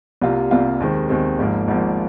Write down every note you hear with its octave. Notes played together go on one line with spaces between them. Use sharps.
C2 C3 G3 A#3 F4
C2 C3 G3 A#3 F4
D#2 D#3 G#3 C4
D#2 D#3 G#3 C4
G#1 G#2 F3 A#3
G#1 G#2 F3 A#3